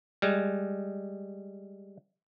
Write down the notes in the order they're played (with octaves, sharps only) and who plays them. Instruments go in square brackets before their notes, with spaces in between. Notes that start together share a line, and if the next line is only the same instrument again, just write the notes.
[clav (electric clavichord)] G3 G#3